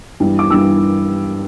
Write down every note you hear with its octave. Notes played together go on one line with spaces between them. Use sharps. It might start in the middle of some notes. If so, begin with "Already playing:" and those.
G2 E3 G3
D6
G2 E3 G3 E6